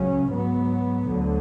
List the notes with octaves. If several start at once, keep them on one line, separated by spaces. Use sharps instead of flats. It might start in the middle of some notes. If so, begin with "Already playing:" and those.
Already playing: C#2 C#3 F#3 C#4
G#2 F#3 B3
D2 D3 F#3